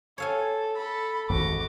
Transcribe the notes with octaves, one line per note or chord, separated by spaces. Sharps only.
A4 C#5 F5 G#5
A4 B5
G#1 F2 G#2 F#4 D6